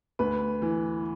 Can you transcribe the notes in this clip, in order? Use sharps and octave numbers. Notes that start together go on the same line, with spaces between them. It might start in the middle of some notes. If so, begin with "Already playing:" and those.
D2 B4
E3